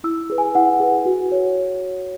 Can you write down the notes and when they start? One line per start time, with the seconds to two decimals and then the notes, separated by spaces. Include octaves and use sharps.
0.04 E4 E6
0.30 G#4 B4
0.38 G#5
0.55 E4 F#5
0.80 G#4 B4
1.05 F#4
1.32 C#5